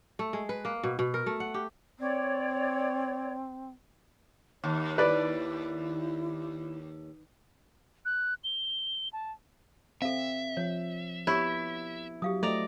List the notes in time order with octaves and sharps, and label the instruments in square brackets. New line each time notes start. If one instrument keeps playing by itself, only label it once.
[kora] A3
G#3
B4
A#3
B2
B2
A#4
A3
F#5
G4
[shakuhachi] C4 [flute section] C#5 D5
[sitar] D#2 [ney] C#5
[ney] E4 [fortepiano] B4 D5
[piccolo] F#6
G7
A5
[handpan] C4 [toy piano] A4 F5 [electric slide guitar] E5
[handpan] F3 [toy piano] C#5
[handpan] B3 [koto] E4 [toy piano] G4 C#5 C#6
[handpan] F#3 [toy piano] G4 F5 D#6
[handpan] A3 C5 D#5 [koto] D5 A#5